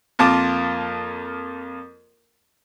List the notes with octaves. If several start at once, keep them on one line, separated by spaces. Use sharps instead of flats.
F2 A#3 F4 A#4 A5 D6